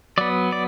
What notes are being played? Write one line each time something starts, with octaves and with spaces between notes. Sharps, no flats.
F#3 B3 D5
D5